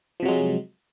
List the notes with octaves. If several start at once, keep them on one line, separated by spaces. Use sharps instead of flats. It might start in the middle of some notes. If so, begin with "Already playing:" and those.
C3 F3 F#3 G#3